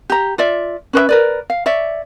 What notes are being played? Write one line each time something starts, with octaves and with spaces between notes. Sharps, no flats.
G4 A#5
F4 D5 E5
C#4 B4 C5 E5
A#4 B4 D5
F5
C#5 D5 E5